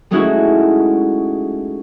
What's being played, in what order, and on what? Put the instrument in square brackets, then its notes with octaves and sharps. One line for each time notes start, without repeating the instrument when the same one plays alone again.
[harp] G#3 A3 C#4 D#4 E4 F#4